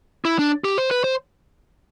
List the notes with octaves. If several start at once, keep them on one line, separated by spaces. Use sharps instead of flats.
E4
D4
G4
C5
B4
C5